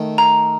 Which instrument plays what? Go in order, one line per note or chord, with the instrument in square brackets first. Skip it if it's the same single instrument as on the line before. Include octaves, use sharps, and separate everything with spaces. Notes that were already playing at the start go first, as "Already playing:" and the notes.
Already playing: [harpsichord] D#3 A3
[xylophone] A#5